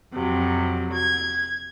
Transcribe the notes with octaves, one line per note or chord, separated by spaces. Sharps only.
F2 C3 F#3
G#6